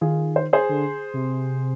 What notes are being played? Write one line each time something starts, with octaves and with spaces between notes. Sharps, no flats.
D#3 F4 G#4
C5
G#4 C5
D3
C3